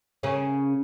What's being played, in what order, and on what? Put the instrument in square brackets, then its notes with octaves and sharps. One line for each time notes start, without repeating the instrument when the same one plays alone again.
[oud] C#3 A#3 C#4